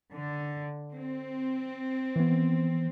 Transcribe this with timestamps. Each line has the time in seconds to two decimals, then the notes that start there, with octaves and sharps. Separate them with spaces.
0.12 D3
0.93 C4
2.16 E3 B3